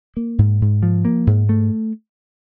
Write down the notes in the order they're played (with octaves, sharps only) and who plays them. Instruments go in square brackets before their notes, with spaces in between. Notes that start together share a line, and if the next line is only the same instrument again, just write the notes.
[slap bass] A#3
G#2
G#2
F3
A#3
G#2
A3